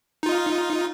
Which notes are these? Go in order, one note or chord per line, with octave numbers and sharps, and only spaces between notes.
D#4 F4